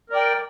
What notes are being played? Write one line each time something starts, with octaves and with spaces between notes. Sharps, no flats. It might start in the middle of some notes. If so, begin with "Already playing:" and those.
A#4 D5 G5